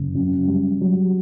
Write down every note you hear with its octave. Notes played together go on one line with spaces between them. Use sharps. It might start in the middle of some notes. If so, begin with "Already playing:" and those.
Already playing: F#1
F#2
G3
F#3